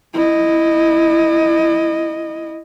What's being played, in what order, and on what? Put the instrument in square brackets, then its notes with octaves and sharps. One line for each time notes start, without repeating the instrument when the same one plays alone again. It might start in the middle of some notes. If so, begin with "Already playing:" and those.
[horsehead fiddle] E4 D#5